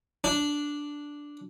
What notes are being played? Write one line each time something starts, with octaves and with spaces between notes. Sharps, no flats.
D4